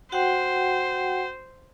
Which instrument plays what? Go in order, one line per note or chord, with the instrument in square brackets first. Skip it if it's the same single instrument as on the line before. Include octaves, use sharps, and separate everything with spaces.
[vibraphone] F#4 F#5 G5 [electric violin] C5